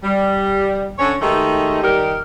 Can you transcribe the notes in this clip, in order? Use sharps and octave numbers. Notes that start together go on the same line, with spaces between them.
G3
D3 C#4 C#5
D#3 G#3 A3 D#4 G4
D#3 G3 D#4 G4 A#4